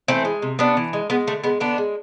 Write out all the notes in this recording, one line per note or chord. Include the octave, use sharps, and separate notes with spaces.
E3 A3 C4
G#3
C3
C3 B3 D4
E3
G#3
G#3 B3
D3 A3
G#3 B3
D3 B3 D4
G#3